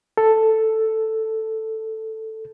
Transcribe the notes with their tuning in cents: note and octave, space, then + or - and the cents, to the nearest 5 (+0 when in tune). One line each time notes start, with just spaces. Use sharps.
A4 +5